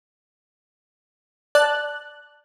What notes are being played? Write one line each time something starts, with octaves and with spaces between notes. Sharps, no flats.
D5 A5 F#6